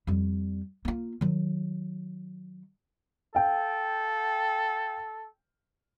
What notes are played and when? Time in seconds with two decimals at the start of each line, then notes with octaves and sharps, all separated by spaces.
0.07 F2 G3
0.85 A#3 F4
1.21 D#3 F#3
3.35 A4 F5 G5